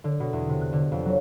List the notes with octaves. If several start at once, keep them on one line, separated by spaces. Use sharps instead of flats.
D3
B2
E2
C3
F#6
D3
F2
F#3